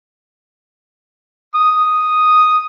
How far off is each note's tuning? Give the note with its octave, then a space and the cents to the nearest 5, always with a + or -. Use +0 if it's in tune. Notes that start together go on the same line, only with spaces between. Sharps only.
D#6 +0